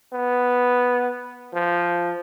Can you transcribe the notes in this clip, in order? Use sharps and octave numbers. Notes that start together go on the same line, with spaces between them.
B3
F3